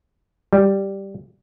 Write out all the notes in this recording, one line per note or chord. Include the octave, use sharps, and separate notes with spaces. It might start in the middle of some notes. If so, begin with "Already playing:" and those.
G3